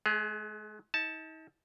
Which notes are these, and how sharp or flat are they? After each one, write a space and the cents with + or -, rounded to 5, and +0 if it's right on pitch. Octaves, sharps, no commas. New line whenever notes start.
G#3 +40 G#4 +0
D#4 +40 A5 +0